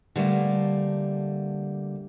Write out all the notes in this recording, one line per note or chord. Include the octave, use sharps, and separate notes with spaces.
D3 G3 A3 A#3